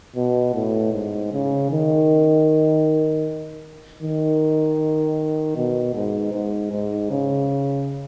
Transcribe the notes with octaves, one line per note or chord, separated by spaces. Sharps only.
B2
A2
G#2
C#3
D#3
D#3
B2
G#2
G#2
G#2
C#3